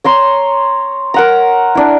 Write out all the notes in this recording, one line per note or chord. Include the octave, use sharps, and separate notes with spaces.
C#5 A#5 C6
A#4 F#5 A#5
D4 E4